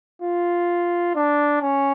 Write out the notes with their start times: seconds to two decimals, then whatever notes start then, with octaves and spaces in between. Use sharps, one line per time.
0.22 F4
1.15 D4
1.61 C#4